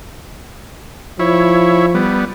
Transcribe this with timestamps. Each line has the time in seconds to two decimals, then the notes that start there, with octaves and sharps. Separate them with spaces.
1.19 F3 E4 C#5
1.95 G3 B3